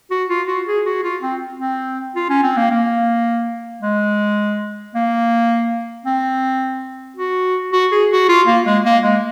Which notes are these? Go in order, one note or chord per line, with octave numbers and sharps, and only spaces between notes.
F#4
F4
F#4
G#4
F#4
F4
C4
C4
F4
C#4
C4
A#3
A#3
G#3
A#3
C4
F#4
F#4
G#4
F#4
F4
A#3
G#3
A#3
G#3